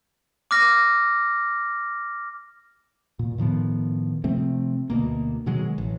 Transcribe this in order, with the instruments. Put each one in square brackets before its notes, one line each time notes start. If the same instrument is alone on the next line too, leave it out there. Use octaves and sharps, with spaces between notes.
[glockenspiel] D6 F6 A#6
[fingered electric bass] A#2
A2 D#3 F3 B3
C3 F3 A3 C4
D2 B2 A#3
B2 D#3 F#3 G#3
A1